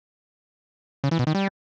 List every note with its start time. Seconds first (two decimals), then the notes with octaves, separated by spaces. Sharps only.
1.04 C#3
1.11 E3
1.19 B2
1.27 D#3
1.35 G3